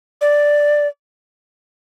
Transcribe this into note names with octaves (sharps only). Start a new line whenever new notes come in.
D5